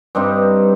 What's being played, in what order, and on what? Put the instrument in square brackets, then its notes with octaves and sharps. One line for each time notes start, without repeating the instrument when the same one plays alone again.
[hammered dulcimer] G2 G3 C4 D#4